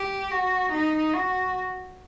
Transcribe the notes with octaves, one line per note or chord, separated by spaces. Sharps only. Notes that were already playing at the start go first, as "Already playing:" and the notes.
Already playing: G4
F#4
D#4
F#4